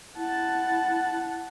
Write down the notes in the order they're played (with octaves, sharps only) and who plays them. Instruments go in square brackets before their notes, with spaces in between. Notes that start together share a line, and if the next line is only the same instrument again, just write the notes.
[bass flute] E4 [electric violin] F#5 A5